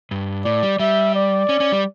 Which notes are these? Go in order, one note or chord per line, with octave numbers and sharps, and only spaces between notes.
G2
A2 D5
G3
G3 E5
D5
C#4
C#4
G3